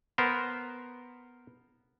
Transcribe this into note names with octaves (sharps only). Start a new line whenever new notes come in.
B3 A#4 C5